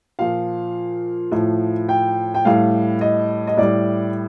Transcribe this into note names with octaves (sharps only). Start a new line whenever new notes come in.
A#2 F3 F5
A2 F3
G5
G5
A2 G3 F5
D#5
D#5
A2 G3 D5